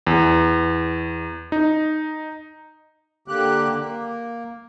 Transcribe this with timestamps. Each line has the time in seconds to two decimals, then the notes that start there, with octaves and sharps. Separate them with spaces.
0.07 E2
1.52 D#4
3.28 D3 A#3 G4 F#6
3.79 A#3